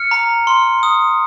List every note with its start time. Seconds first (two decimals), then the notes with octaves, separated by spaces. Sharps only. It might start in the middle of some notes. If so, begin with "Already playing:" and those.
Already playing: F6 C#7
0.11 A#5
0.47 C6
0.83 D#6